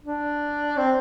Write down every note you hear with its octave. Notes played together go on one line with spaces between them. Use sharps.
D4
C4